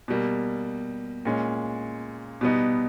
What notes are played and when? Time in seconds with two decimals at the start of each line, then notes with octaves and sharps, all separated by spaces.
0.08 B2 G3 A#3
1.25 A#2 G#3 C#4
2.41 B2 G3 B3 D#4